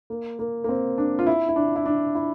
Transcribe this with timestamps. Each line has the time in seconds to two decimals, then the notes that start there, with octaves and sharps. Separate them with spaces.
0.10 A#3
0.39 A#3
0.64 A#3
0.69 C4
0.98 D4
1.19 F4
1.27 E4
1.49 E4
1.56 D4
1.76 E4
1.86 D4
2.15 E4